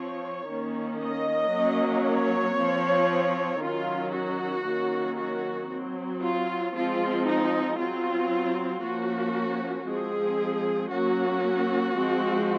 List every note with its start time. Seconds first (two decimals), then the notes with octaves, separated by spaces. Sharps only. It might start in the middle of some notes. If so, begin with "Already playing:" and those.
Already playing: F3 C4 C#5
0.48 D#3 A#3 C#4
1.00 D#5
1.52 F#3 A#3 C#4
2.05 C#5
2.56 F3 C4
3.61 D#3 F#3 C#4 F4
4.12 F#4
4.65 D#3 F#3 A#3 C#4
5.18 F#4
5.69 F#3 C4
6.22 F4
6.74 F3 G#3 C4 F4
7.26 D#4
7.78 F#3 C4 F4
8.82 F3 A#3 C#4 F#4
9.87 F3 G#3 C4 G#4
10.91 F#3 A#3 C#4 F#4
11.96 F3 G#3 C4